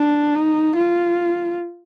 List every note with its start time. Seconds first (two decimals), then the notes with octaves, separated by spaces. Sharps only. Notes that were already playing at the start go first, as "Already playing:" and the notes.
Already playing: D4
0.35 D#4
0.76 F4